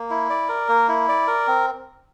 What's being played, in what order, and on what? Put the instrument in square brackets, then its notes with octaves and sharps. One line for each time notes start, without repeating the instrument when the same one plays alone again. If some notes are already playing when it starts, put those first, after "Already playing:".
Already playing: [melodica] A#3
E4
D5
A#4
A#3
E4
D5
A#4
C4